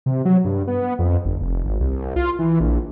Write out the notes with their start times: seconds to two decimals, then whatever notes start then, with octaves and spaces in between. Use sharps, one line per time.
0.06 C3
0.25 F#3
0.45 G2
0.67 B3
0.99 F2
1.25 G1
1.41 F1
1.64 G#1
1.80 C2
2.16 F4
2.39 E3
2.60 A#1